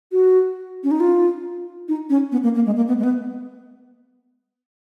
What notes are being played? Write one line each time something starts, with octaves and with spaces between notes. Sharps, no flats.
F#4
C#4
D#4
F4
D#4
C#4
B3
A#3
A#3
G#3
A#3
B3
G#3
B3